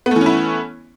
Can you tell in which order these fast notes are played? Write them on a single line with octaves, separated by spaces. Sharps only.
B3 A3 E3 C#4 E4